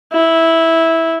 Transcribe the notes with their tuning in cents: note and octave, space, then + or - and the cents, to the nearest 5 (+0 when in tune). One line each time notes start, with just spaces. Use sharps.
E4 -10